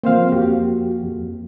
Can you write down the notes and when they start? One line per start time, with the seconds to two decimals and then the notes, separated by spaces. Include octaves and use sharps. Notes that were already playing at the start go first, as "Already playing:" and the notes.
0.03 F3 A#3 C4 C5 F5
0.32 F2 F#4 G4
1.04 F2